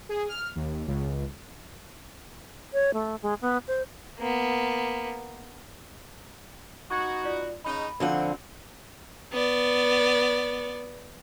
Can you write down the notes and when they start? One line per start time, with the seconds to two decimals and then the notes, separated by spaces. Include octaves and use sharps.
0.09 G#4
0.29 F6
0.56 D#2
0.87 C#2
2.73 C#5
2.94 A3
3.22 G#3
3.42 B3
3.68 C5
4.18 A#3 B3
6.90 B3 D#4 F#4 C#6 G#6
7.25 F4 D5
7.65 C#3 D#4 B5
8.00 D3 F3 C4 F#5
9.32 B3 D5